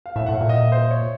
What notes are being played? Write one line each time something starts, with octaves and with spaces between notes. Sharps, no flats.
F5
A2 E5
A2 F#5
F5
A#2
D#5
E5
C5
C#5